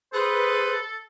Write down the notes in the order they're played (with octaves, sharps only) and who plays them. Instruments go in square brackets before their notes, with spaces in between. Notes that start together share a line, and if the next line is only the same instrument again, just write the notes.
[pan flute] G#4 [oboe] A4 [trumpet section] B4 [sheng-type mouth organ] C5 F#6